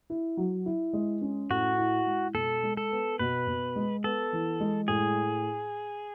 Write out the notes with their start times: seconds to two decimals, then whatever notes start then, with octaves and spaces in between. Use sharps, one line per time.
0.10 E4
0.37 F#3
0.66 E4
0.93 G#3
1.21 C#4
1.50 A2 F#4
1.78 E4
2.06 G#3
2.34 B2 A4
2.63 G#3
2.77 A4
2.91 B3
3.19 B2 B4
3.47 B2
3.76 G#3
4.04 B3 A4
4.33 E3
4.60 G#3
4.88 A2 G#4